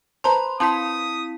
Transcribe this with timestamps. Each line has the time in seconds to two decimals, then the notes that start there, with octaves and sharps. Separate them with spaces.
0.24 B4 C5 A5 A#5 C6
0.60 C4 E4 A5 C6 D#6 B6